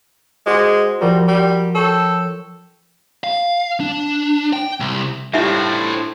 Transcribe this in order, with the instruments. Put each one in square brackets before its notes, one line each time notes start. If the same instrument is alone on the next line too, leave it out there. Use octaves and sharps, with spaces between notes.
[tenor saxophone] G#3 [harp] F#4 C5 D6
[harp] F3 F#4 A#4 [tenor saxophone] G3
[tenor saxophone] G3
[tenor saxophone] A4 [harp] C#5 G5
[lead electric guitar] F5
D4
G5
C2
[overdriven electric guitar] A2 [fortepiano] G3 F4 [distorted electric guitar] D4 C5 [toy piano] D#4 E5